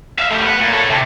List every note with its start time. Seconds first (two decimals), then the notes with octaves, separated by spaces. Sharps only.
0.18 E5 F5
0.31 A3 G4
0.43 B3 F#5
0.60 A#2
0.73 A4 C#5
0.90 C3